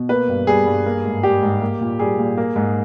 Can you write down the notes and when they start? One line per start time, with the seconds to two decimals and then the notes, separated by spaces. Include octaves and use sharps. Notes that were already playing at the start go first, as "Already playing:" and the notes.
Already playing: B2
0.09 A#3 B4
0.28 G2
0.47 G3 G#4
0.66 G2
0.86 A#3
1.05 G#2
1.23 G3 G4
1.42 G#2
1.61 A#3
1.81 A#2
1.99 G3 G#4
2.19 A#2
2.37 A#3
2.56 G#2